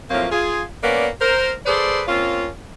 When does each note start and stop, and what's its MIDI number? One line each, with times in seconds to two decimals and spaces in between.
0.11 0.28 45
0.11 0.28 53
0.11 0.28 54
0.11 0.28 58
0.11 0.28 60
0.11 0.28 65
0.32 0.63 65
0.32 0.63 68
0.84 1.07 58
0.84 1.07 59
0.84 1.07 61
0.84 1.07 71
0.84 1.07 74
1.21 1.53 70
1.21 1.53 72
1.66 2.02 68
1.66 2.02 69
1.66 2.02 71
1.66 2.02 72
1.66 2.02 74
2.08 2.48 58
2.08 2.48 60
2.08 2.48 61
2.08 2.48 65